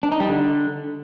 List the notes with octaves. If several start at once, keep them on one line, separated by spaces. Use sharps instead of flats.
D4
D#4
G3
D3